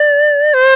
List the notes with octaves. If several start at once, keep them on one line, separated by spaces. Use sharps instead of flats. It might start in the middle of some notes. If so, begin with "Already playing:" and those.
Already playing: D5
C5